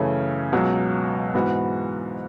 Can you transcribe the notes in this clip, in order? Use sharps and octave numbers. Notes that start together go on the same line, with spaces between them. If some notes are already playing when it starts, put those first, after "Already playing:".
Already playing: F#2 C#3 E3 A3 C#4
C#2 B2 F#3
G#2 E3 B3 F#4